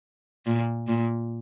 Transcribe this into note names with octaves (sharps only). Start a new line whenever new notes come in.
A#2
A#2